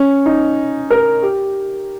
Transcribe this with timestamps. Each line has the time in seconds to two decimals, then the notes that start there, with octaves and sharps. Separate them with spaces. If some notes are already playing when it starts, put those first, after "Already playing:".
Already playing: C#4
0.26 D#4
0.90 A#4
1.22 G4